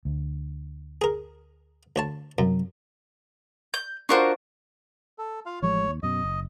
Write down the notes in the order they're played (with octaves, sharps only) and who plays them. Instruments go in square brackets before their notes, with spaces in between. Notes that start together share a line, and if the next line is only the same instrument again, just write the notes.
[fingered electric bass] D2
[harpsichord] G#4 A#4
D2 C#5 A5
[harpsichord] F#2 [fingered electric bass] C3 F#3
[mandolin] G6
[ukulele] D4 F4 C5 [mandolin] F#4 A#4 C#6
[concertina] A4
F4 F5
[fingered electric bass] A1 F3 G#3 [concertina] C#5
[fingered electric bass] D#2
[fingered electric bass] F#2 B2 [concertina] D#5
[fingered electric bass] F#1